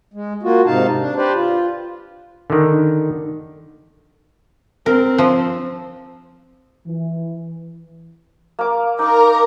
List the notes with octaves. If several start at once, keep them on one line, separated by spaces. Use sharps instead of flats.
G#3
A#3 F4 F#4
G#2 C3 D#4 F5 A5
D4
G4 B4 C5 D5
F4
D3 D#3
C4 A#4
F3
E3
A#3 D6
D#4 A#4 A#5 D6